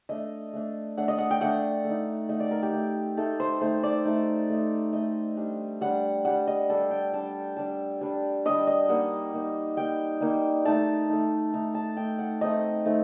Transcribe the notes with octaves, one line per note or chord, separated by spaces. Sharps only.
A3 D4 D#5
A3 D4
A3 D4 F#5
D#5
F#5
G5
A3 D4 F#5
A3
D#4
A3 D#4 D#5
D5
A#4
G4
A3 D#4
A3 D#4 A4
C5
A3 D#4 C5
D5
A3 D#4
A3 D#4
A3 D#4 D#5
G3 D4
G3 D4 F#5
G3 D4 F#5
D#5
G3 D4 A4
G5
G3 D4 A5
G3 D4 A5
G3 D4
G3 D4 D#5
D#5
G3 A#3 D#4 F#5
G3 A#3 D#4
G3 A#3 D#4 G5
G3 A#3 D#4
A3 D#4 A5
A3 D#4
A3 D#4 A#5
A5
A3 D#4 G5
F#5
A3 C4 D#4 D#5
A3 C4 D#4